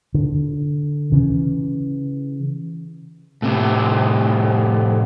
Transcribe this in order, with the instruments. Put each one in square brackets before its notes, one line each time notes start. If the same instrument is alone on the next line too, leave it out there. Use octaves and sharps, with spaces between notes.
[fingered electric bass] D3
C#3 E3
[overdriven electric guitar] A2 C3